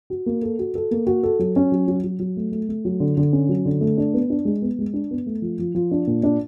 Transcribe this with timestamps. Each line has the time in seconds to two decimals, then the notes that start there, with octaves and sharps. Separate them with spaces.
0.10 F#4
0.26 A#3
0.42 A4
0.59 F#4
0.75 A4
0.91 A#3
1.07 F#4
1.23 A4
1.39 F#3
1.56 C#4
1.72 F#3
1.88 F#3
2.04 F#3
2.19 F#3
2.37 A3
2.52 A3
2.69 A3
2.85 F#3
3.00 D3
3.17 D3
3.33 C#4
3.49 F#3
3.65 D3
3.81 A3
3.98 D4
4.14 B3
4.30 D4
4.45 G#3
4.62 B3
4.79 G#3
4.94 D4
5.11 B3
5.26 A3
5.42 F3
5.59 F3
5.75 F3
5.91 D4
6.07 A#2
6.23 D4